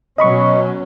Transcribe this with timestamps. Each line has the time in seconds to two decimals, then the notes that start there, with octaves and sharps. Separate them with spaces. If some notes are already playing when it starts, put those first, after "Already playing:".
0.18 B2 F#3 C#4 D#5 B5 C#6